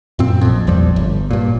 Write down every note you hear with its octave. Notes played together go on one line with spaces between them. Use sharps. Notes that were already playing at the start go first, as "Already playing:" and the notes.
F#2 A#2 C4
A#1 F2
A#1 E2 F3 G3
G1
G2 A#2